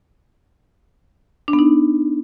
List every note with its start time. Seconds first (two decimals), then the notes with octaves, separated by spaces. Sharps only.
1.48 D4
1.53 B3
1.59 D#4